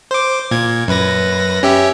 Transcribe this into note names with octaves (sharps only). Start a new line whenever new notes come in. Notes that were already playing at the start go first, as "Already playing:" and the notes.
C5 D6
A#2 G#6
F#2 B4 A#6
C#4 G4 E5